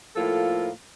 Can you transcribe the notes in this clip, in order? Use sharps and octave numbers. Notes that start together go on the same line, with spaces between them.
A2 F3 A#3 F4 A4